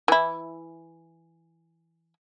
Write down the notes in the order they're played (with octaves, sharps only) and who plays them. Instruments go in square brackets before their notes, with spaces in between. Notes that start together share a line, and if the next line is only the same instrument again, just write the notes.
[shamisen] E3 E4